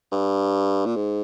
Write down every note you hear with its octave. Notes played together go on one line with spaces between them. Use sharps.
G2
A#2
G#2